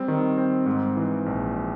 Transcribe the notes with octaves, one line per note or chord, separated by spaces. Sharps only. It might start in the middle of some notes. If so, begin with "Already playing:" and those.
Already playing: G3 C4
D#3
C4
G#2
E3
A#1